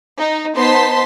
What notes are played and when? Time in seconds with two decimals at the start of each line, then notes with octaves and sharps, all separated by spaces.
0.18 D#4
0.55 B3 D#4 C5 A5 C6 B6